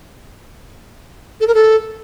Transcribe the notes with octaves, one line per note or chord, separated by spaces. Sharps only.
A4
A#4
A4